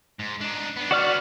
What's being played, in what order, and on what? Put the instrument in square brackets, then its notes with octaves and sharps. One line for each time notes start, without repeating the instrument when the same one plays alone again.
[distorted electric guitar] G#2
D4 D#4
B3 D4
[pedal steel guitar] F#4 D5 F6